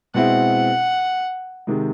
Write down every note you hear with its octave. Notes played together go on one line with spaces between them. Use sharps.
B2 G#3 C4 E4 F#5
C3 D#3 G#3